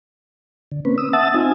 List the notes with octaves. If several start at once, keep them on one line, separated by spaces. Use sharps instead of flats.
D3
A#3 C4 C#4 B4
D#6 E6
E5 F#5 A5 D#6 E6 A6
C4 D#4 F4 G#5